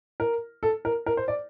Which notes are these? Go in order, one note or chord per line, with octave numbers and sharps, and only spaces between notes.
A#4
A4
A#4
A#4
C5
D5